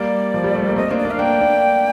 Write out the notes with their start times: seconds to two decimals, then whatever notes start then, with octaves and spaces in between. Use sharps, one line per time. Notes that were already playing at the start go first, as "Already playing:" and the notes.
Already playing: G3 A#3 D5
0.34 F3
0.44 G3
0.55 A3
0.66 A#3
0.76 A3 C4 D#5
0.91 A#3 D4 C5
0.98 D5
1.05 A#3 D4
1.11 F5
1.19 A#3 D4 G5
1.41 A#3 D4